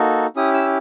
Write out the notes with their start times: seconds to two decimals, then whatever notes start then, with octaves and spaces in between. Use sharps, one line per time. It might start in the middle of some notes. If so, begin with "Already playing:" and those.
Already playing: A#3 D#4 F#4 A4
0.36 C#4 E4 G4 D#6
0.54 E6